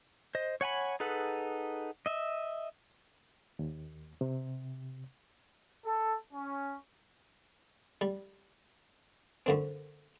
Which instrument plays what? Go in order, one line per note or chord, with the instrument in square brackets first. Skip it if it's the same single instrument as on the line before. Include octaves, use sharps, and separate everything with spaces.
[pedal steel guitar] C5 D#5
C#5 F#5 G#5 B5
D#4 G#4 A4 B4 F#5
D#5 E5
[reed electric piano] D#2
C3
[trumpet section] A4
C#4
[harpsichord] G3
F#2 D3 C4